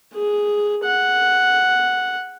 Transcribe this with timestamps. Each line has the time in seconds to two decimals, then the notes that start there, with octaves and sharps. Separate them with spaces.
0.14 G#4
0.85 F#5